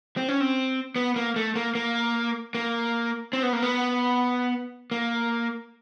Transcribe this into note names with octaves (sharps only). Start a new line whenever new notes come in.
C4
C#4
C4
B3
A#3
A3
A#3
A#3
A#3
C4
B3
A#3
B3
A#3